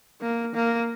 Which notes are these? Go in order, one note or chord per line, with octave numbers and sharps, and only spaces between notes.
A#3
A#3